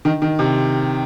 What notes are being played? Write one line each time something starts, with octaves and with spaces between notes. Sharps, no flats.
D#3
D#3
C3